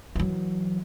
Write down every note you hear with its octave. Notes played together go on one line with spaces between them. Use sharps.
E3 F#3